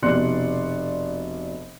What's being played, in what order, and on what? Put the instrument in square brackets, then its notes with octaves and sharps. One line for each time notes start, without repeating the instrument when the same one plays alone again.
[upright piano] F1 B2 D5 C6 F#6 C#7